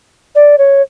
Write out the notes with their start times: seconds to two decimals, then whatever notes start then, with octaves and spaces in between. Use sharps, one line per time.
0.35 D5
0.58 C#5